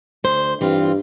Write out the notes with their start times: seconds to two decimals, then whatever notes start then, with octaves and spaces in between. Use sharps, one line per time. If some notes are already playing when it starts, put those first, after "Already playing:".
0.24 D2 C5
0.61 G2 E3 C4 F4